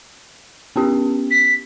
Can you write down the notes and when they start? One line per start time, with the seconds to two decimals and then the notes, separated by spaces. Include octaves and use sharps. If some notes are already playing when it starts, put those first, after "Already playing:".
0.76 B3 C#4 G4
1.31 B6